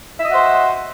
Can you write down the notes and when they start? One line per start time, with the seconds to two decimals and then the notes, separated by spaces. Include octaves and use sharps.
0.19 E5
0.23 D#5
0.26 F#4
0.30 F#5
0.34 C5